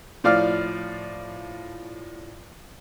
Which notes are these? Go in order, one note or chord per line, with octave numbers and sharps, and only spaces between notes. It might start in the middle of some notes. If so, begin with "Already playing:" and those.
A2 F3 D5 F5 F6